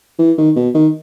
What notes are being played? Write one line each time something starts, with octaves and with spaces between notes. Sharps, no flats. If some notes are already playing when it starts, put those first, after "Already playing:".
E3
D#3
B2
D#3